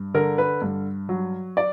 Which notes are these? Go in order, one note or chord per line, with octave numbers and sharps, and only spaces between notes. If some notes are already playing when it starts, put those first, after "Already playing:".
Already playing: G2
D3 A#4
B4
G2
F#3
D5